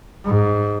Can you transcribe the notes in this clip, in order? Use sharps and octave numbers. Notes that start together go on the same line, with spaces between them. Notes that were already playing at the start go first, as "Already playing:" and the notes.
G#2